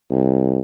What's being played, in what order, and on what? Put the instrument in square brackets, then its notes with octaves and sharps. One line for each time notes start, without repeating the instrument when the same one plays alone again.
[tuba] C2